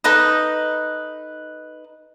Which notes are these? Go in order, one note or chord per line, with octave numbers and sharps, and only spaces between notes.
D#4 A4 B4 D#5